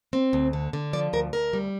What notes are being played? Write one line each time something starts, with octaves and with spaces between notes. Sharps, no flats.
C4
D2
D3
D3
F3 D5
D2 A#4
D2 A#4
G3